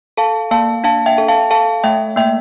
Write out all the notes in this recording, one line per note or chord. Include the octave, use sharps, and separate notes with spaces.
A4 F5 A5
A#3 F5 A5
D4 F5 A5
E5 G5
A4
F5 A5
A4 F5 A5
A3 E5 G5
A#3 E5 G5